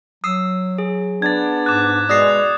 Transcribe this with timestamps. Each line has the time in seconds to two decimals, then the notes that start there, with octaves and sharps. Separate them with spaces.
0.24 F#3 D#6 E6 C7
0.78 G#4
1.22 B3 D4 G#6 A6
1.66 G#2 D6 F#6
2.09 B2 G#3 D5 D#6 A#6 C7